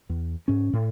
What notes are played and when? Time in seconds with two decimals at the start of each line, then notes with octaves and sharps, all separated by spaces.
0.09 E2
0.48 G#2 C#4
0.73 A2